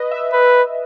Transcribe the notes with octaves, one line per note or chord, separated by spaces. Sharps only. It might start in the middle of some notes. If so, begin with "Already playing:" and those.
Already playing: B4 D#5
E5
B4